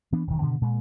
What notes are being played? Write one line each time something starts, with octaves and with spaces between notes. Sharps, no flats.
E3 B3 D4
E1 D2 D#3
G2 B2 D3 D#3
A#2 G#3